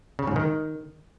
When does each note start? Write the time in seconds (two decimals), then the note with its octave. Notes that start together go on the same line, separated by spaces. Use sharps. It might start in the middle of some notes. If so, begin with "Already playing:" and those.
0.19 C#3
0.27 G#2
0.36 D#3